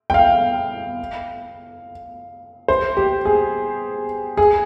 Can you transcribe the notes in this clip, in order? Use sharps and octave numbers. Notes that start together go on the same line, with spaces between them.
G5
F5
C5
G4
G#4
G#4